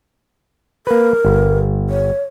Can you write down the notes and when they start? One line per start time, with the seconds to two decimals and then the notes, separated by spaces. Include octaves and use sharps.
0.87 A#3 A#4 B4
1.25 G1
1.89 C#5